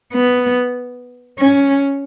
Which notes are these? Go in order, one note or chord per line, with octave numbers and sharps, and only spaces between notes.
B3
C#4